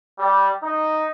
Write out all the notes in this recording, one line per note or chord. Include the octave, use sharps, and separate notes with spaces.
G3
D#4